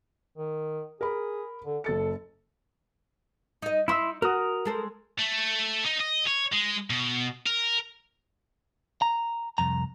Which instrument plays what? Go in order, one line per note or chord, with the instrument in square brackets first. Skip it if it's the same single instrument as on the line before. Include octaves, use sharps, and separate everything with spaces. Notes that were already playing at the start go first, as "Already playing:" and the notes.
[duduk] D#3
[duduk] G#4 [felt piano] A#4 B5
[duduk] D3
[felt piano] F#1 A6 C#7 [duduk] A4
[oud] D#4 D#5
[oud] D#4 E5 [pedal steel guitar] E4 C6 E6
[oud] F#4 [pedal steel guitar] A#4 D#6
[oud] G#3 A4 C5
[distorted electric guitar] A3
D#4
D#5
C#5
G#3
B2
A#4
[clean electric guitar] A#5
C2 F2 A#5